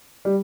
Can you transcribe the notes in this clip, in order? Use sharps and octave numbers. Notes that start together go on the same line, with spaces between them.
G3